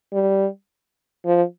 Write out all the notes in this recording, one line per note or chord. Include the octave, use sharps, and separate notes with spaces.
G3
F3